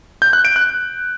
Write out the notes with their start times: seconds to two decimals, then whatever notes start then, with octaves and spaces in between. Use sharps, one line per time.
0.22 G6
0.33 F#6
0.45 D7
0.56 F#6